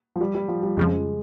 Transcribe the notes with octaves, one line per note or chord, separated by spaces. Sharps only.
F3
G3
G3
F3
G3
F2 C#3 F3 G#3